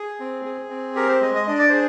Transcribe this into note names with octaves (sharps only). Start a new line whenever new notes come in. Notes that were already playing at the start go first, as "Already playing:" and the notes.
Already playing: G#4
C4
G#4
C4
G4 A#4
C5
G#3 D#5
D#5
D4 D#5
D5
G#4 C5